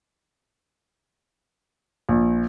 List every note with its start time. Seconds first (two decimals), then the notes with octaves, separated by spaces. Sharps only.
2.09 A#1